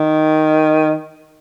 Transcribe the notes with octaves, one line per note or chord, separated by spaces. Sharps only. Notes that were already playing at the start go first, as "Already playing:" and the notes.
Already playing: D#3